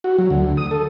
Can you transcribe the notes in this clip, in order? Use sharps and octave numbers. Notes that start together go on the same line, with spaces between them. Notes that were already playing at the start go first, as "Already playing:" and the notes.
F#4
F#3
D2
D#6
A4